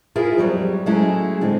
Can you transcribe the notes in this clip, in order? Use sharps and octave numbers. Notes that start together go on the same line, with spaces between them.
E4 F4 G#4 A#4 E5
F2 G#2 F#3 G3
F#3 G#3 A3 C#4 E4 G#4
A2 D3 G#3 C4